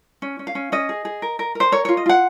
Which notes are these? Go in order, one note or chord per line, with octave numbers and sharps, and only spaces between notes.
C#4
C#4
F5
C#4
C#4 D#5
G#4
G#4
A#4
A#4
A#4 C5
A#4 C#5
F4 C#5
D#5
F4 F#5